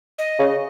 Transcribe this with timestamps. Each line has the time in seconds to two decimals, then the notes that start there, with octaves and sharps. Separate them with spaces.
0.19 D#5
0.39 C#3